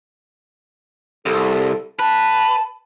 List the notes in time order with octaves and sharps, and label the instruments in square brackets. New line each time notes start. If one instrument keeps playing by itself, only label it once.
[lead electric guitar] C2 [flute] A4
[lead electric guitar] B4 [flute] A5